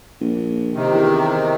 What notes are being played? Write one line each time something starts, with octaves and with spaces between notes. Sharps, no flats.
A#1
C3 D#3
E2